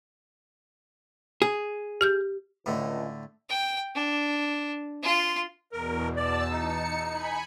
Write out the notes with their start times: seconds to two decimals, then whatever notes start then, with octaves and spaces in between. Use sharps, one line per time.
1.42 G#4
2.01 G4 F6 G6
2.66 C#2 A2 D3
3.49 G5
3.95 D4
5.02 F4 C6
5.72 E2 B2 A#4
6.16 E2 D5 A5 E6
6.51 D#4 C#7
7.11 G#5 B5